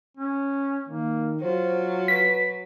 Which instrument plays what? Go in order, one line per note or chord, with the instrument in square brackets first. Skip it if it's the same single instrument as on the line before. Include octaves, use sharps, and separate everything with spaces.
[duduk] C#4
[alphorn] D#3 [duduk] A#3
[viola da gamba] F#3 [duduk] F4 [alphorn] C5
[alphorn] B4 [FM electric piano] B6